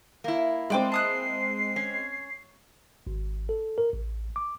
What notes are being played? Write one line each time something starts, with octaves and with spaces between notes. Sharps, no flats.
A#3 E4
G#3 C4 D5 G5 D6
A5 D#6 F#6 C7
C#4
G#1
A4
A#4
A1
D6